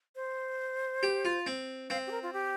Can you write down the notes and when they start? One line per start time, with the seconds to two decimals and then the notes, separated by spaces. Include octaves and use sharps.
0.16 C5
1.03 G4
1.25 F4
1.46 C4
1.90 C4 F5
2.07 G4
2.11 A#4
2.23 F4
2.33 G4